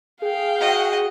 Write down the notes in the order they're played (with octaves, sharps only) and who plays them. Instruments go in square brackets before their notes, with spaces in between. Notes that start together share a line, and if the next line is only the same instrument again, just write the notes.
[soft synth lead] G#4 [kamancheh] F5 G5
[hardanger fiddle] F#4 D#5